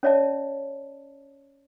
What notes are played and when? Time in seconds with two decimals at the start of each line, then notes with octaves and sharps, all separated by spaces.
0.03 C#4 C#5 D5 E5 A5